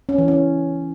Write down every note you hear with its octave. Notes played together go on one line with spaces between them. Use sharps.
C#4
E3
C#4